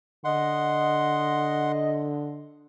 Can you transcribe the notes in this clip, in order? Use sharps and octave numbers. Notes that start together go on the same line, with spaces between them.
D3 D#5 F#5 C6